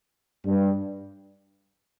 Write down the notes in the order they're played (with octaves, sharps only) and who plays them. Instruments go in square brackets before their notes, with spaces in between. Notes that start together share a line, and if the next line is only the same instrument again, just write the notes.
[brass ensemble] G2